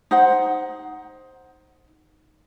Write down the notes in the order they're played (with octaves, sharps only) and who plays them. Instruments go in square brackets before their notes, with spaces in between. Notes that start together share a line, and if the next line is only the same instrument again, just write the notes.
[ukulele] D#4 C5 F#5